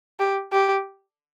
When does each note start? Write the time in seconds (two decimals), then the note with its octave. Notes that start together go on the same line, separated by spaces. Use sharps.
0.20 G4
0.52 G4